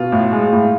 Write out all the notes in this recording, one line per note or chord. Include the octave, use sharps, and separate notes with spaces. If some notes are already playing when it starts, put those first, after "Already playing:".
Already playing: B2 F4
A2
G#3
A2